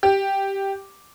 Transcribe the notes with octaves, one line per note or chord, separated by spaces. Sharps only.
G4